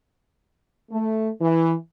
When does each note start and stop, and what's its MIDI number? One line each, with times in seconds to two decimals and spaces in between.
0.91 1.29 57
1.39 1.72 52